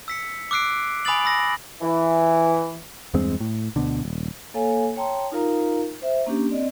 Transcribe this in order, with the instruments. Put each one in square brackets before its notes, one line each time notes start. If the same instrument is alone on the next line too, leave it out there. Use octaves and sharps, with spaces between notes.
[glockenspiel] E6 B6 C#7
D6 E6 F#6 C7 D7
G#5 B5 D#6 F#6 A6 F#7
B5 E6 A#6
[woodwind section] E3
[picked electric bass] E2 G2 G#3 C4
A2
D2 B2 D3
D#1
[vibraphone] A#3 A4 C#5 F5 G#5
C#5 G5 A5 A#5 C6
D#4 F4 A#4 F5 A#5
C5 E5
A#3 C#4 D4 G4
C4 D5 D#5